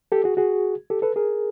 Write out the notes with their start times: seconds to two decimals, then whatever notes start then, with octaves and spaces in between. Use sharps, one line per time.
0.12 G4 A4
0.24 F#4 G#4
0.37 F#4 G#4
0.90 G4 A4
1.02 A4 B4
1.16 G#4 A#4